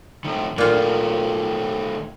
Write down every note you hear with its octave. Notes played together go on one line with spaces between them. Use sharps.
A2 D#3
A#2 D#3 A3 F4